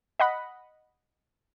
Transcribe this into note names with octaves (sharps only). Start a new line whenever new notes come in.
D#5 F#5 B5